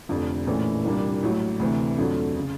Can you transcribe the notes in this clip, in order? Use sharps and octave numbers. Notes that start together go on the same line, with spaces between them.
F1 F2 D3
A#1 A2 E3 A3 C#4
C2 A#2 G3 A#3 D4
A1 A2 F#3
D2 C3 E3
F2 D3 F#3 A3
C#3